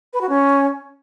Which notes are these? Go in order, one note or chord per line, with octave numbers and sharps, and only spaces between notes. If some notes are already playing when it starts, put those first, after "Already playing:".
B4
F#4
C#4